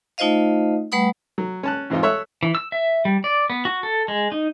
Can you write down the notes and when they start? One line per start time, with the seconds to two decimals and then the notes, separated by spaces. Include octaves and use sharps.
0.18 A3 D#4 F4 C5 D#5 F5
0.92 G3 A3 B4 F#5 B5 D#6
1.38 F#3
1.63 C#4 A5 F#6
1.90 E2 G#2 C4 D#4 F4
2.02 A4 C#5 E5 F#6
2.43 E3
2.55 E6
2.72 E5
3.05 G3
3.24 D5
3.50 B3
3.65 F#4
3.83 A4
4.08 G#3
4.32 D#4